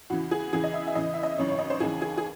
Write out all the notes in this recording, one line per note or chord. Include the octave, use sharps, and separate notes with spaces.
E2 C#3 E3 F#4
G#4
E2 C#3 E3 G#4
D#5
E5
E5
E2 C#3 E3 D#5
E5
D#5
G#1 F#2 C#3 E3 C#5
C#5
D#5
C5
D#2 C#3 E3 G#4
G#4
G#4